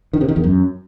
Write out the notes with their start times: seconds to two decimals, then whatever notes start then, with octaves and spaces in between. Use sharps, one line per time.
0.13 D#3
0.21 C3
0.28 D#3
0.36 E2
0.43 F#2